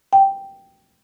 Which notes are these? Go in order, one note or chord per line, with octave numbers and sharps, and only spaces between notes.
G5